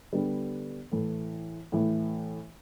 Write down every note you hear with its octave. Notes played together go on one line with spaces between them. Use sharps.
D3 G3 B3
A2 E3 A3
A2 E3 A3